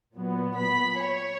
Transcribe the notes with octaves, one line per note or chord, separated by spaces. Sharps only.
A#2 F#3 B3
B5
C#5